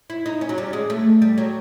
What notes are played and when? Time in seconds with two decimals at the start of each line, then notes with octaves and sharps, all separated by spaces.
0.10 E4
0.26 D#4
0.41 C#4
0.49 F#3
0.58 G3
0.73 G#3
0.90 A3
1.22 G3
1.38 F#3